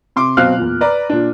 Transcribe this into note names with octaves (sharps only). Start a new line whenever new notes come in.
C3 C6 D6
B2 F#3 C4 F5 F6 F#6
E2 A#2
B4 D5 A#5
A#2 D4